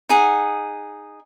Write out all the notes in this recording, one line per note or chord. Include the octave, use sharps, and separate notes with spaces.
D#4 G#4 F#5